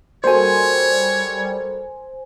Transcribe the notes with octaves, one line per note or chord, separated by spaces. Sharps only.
G3 A#3 F#4 A4 C5 C#5 G#5